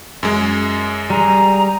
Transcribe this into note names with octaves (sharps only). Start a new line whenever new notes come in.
F#2 G#3
G3 G#4 A#5